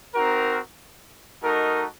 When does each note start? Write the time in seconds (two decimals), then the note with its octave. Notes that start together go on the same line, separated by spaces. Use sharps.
0.15 C4 D#4 F#4 A#4
1.42 A3 D#4 F#4 A#4 D#5